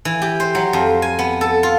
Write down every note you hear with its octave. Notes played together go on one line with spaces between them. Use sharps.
E3
G4
C5
F#3
F2
G#5
B3
A4
F4